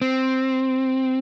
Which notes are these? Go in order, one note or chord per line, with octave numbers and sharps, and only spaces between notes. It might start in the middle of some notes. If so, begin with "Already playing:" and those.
C4